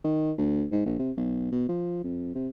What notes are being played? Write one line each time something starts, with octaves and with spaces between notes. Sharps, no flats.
D#3
D2
G#2
A#1
C3
B1
B2
F3
F2
C3